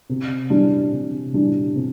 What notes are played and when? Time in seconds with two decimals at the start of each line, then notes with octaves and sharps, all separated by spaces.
0.10 C3
0.50 E3 G3 D4
0.92 C3
1.34 E3 G3 D4
1.76 C3